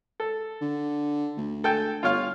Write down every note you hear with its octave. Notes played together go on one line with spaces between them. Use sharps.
A4
D3
D2
A4 G5 G#5
G1 F4 C#5 F5